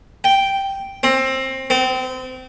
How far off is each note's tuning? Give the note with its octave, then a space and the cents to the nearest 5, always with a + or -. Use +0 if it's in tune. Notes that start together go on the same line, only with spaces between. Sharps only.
G5 -5
C4 +20
C4 -30